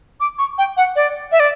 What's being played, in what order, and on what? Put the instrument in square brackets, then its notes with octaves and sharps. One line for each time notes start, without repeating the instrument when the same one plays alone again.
[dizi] D6
C#6
G5
F#5
D5
E5
D5